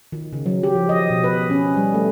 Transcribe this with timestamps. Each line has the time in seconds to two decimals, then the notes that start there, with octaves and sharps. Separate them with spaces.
0.12 D#3
0.33 C#3
0.46 F#3
0.63 G4
0.75 F3
0.89 D#5
1.10 B2
1.24 B4
1.50 C#4
1.77 G3
1.94 A3